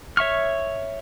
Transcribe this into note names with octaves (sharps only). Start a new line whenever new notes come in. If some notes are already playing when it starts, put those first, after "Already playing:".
C#5 E5 C#6 F6